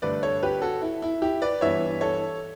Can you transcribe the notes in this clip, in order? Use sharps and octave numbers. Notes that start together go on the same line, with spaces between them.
G2 D3 A3 B4 D5
A4 C#5
G4 B4
F#4 A4
E4
E4
E4 G4
B4 D5
G2 E3 B3 C#5 E5
A4 C#5